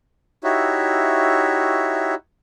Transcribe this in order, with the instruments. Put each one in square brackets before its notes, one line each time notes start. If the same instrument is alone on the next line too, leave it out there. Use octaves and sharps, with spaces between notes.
[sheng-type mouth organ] D#4 E4 F#4 G4 C#5 E5